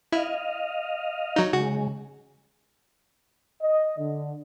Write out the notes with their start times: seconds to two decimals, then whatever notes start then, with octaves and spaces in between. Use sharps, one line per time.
0.12 E4 D#5 F5
1.36 F#3 D#4
1.53 C#3 G#3 F#4
3.61 D#5
3.99 D3